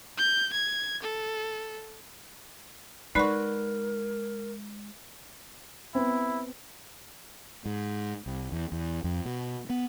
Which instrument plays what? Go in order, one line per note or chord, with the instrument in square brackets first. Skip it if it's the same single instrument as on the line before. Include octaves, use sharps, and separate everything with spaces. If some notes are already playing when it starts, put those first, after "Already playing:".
[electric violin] G6
G#6
A4
[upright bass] G#3 [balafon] D#4 D5 B5 [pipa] F#4 B4 [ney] A#4
[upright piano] B3 C4 [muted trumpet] E4
[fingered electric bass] G#2
C2
E2
E2
F2
B2
B3